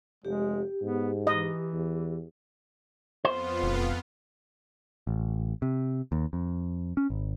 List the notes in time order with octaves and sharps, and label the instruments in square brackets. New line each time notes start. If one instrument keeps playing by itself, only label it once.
[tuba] F1 [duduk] G#3 [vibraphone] G4
[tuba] G#2 [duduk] B3
[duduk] E3 [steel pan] D#5
[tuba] E2
[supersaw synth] F2 B3 F4 [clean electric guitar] C5
[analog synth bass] E1
[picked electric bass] A1
C3
D#2
F2
C#4
G#1